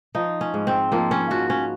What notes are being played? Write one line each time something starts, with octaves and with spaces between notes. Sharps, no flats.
F3 D#4
C#4
G#2
C4
F3 A#3
C#4
F3 F#4
C#4